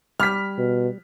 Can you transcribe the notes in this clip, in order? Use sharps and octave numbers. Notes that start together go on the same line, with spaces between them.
G3 F6 B6
B2